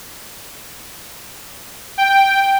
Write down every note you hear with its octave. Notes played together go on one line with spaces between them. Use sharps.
G5